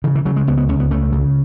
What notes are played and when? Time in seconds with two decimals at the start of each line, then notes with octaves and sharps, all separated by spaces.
0.04 C#3 E3
0.15 E3
0.25 C#3 F#3
0.36 G#3
0.47 C#2 B3
0.58 B3
0.69 C#2 C#4
0.80 B3
0.91 C#3 A3
1.12 C#3